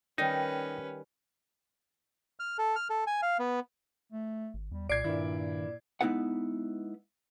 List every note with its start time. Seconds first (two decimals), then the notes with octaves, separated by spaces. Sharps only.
0.18 D#3 G3 C#4 D#4 B4 F5
2.40 F6
2.58 A4
2.76 F6
2.90 A4
3.07 G#5
3.22 F5
3.39 B3
4.12 A3
4.54 G#1
4.71 E2 G3
4.89 C2 A#2 D5 G#6 C7 D7
5.04 G2 A#2 D#3 E4
6.01 G#3 B3 D#4 E4 B4 F#5